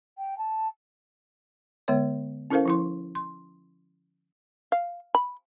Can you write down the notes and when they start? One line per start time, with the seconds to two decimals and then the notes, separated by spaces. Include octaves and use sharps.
0.18 G5
0.38 A5
1.88 D3 G#3 B3 C#5
2.50 C#4 E4 A4 A#4 C5 F5
2.66 F3 E4 C6
3.15 C6
4.72 F5
5.15 B5